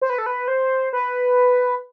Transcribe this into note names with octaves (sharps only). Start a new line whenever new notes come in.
C5
B4
A4
B4
C5
B4